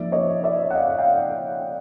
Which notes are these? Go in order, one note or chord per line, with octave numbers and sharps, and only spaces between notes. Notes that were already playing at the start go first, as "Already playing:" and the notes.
Already playing: F3 A#3 D#4 D5 E5
C#5 D#5
D5 E5
F#5
D#5 F5
F5 G5